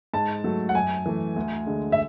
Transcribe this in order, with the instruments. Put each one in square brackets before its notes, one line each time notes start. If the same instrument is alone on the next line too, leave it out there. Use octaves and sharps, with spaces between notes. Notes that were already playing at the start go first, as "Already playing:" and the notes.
[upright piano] G#2 A5
F#3 A3
F#5
F#2 G#5
E3 A3
D2
D3 G#3
E5